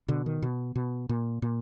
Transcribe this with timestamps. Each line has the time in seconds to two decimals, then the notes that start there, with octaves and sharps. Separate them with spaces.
0.08 B2 D3
0.26 D#3
0.42 B2
0.76 B2
1.09 A#2
1.42 A#2